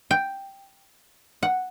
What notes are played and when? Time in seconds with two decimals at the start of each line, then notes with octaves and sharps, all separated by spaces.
0.11 G5
1.43 F#5